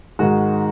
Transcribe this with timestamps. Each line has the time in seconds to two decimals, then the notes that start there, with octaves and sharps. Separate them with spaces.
0.19 G#2 D#3 G#3 F#4